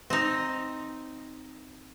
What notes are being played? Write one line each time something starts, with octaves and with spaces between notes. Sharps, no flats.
C4 D#4